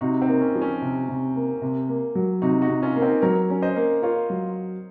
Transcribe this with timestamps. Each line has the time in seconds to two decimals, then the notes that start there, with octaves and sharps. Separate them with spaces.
0.01 C3 D#4 F#4
0.22 C4 D#4
0.28 A#3
0.41 C#4
0.55 F3
0.62 C#4
0.82 C3
1.09 C3
1.36 A#3
1.62 C3
1.88 A#3
2.15 F#3
2.42 C3 D#4 F#4
2.62 D#4 F#4
2.69 C3
2.82 C#4 F4
2.96 A#3
3.02 C4 D#4
3.22 F#3 A#4 C#5
3.50 C#4
3.62 C5 D#5
3.76 A#3
4.02 F4 A#4 C#5
4.30 F#3